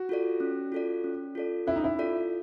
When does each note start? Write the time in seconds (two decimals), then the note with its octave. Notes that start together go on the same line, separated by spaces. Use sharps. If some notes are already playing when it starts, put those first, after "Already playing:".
Already playing: F#4
0.09 F4 A4 D5
0.40 C#4
0.72 F4 A4 D5
1.04 C#4
1.35 F4 A4 D5
1.67 C#4 E4
1.76 D#4
1.84 E4
1.99 F4 A4 D5